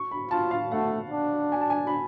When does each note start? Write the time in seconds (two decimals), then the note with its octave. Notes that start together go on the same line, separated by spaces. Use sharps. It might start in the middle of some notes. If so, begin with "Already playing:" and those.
Already playing: C#6
0.11 B5
0.31 F4 A5
0.51 F5
0.71 A3 F#5
1.11 D4
1.52 G#5
1.61 A5
1.70 G#5
1.87 B5